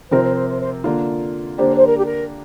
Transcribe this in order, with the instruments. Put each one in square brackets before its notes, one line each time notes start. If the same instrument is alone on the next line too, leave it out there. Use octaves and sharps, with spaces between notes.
[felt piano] C3 F3 C4 A#4 [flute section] C5
[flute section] C5
C5
C5
C5
[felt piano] D3 A#3 F4
[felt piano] D3 A#3 D4 G4 [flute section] C5
[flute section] C5
A#4
G4
A#4